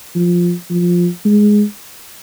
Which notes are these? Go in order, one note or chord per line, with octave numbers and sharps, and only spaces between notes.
F3
F3
G#3